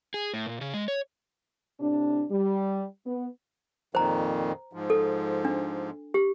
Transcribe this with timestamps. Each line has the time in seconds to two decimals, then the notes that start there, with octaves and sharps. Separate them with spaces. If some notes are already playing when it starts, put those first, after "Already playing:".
0.14 G#4
0.34 A2
0.47 A#2
0.61 C#3
0.74 G#3
0.88 C#5
1.80 A2 C3 D4
2.29 G3
3.05 B3
3.95 F2 A#2 D#3 C5 A#5
4.73 G#2 F3
4.90 A4
5.45 D4
6.14 G4